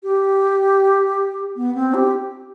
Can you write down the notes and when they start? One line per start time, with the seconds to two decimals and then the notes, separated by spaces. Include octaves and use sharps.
0.03 G4
1.56 B3
1.75 C4
1.94 G4